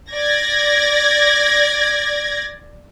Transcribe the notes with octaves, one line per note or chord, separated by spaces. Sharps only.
D5 G#6 A#6